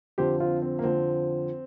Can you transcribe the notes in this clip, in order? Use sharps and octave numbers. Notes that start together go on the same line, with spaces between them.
F2 D3 F3 G4 C5
C4 F4
C4
A#3
F2 D3 F3 C4